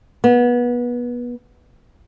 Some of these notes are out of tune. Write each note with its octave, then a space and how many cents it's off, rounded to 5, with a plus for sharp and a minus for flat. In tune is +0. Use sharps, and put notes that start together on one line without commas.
B3 -25